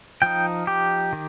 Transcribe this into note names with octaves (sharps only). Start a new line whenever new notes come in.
F3 D#4 G5
G4
D#3